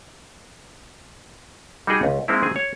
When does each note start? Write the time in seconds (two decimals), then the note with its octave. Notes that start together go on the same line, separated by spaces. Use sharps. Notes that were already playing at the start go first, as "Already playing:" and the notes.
1.87 G3 D#4 F#4 G#4 G5
2.03 C#2
2.28 G#3 A#3 C4 D#4 E4
2.42 D#3 C4 G#4 G#5
2.56 C#5